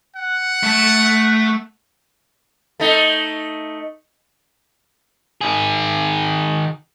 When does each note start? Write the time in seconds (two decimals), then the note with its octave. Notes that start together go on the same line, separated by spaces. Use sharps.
0.16 F#5
0.63 A3 A5
2.80 A3 D#4
5.41 D#3 G#4